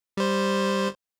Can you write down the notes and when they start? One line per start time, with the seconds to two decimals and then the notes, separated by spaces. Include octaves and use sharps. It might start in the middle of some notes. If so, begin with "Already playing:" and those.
0.17 G3 C5